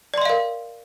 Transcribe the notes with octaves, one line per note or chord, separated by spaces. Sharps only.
A#4 D5 D#5 F5 C6